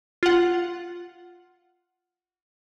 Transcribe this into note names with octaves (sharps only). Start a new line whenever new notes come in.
F4 F#5